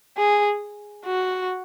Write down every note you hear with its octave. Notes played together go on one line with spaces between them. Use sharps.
G#4
F#4